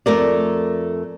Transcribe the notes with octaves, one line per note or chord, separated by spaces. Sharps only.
F2 A3 A#4 D5